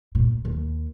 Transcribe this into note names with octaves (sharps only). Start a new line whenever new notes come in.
A#2
D#2